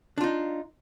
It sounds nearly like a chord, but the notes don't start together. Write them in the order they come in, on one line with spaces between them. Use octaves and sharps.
D4 F4 D#4